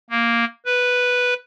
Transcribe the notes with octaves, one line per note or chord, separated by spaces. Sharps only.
A#3
B4